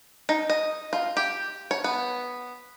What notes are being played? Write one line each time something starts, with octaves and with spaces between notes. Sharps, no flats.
D#4
D#5
F4
G4
C#5
B3